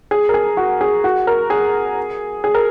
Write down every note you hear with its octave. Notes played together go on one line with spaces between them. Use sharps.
G#4
A#4
G#4
F#4
G#4
F#4
A#4
G#4
G#4
A#4